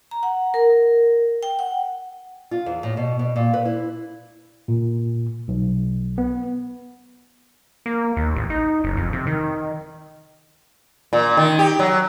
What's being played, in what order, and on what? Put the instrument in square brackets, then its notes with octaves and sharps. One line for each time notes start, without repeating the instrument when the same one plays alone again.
[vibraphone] A#5
F#5
A#4
G5
F#5
[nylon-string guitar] F4
E2
A2
B2
B2
A#2
B4
E4
[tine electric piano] A#2
B1
B3
[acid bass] A#3
D#2
A1
D#4
F#1
F2
C3
D#3
[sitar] A#2
D#3
G4
F#3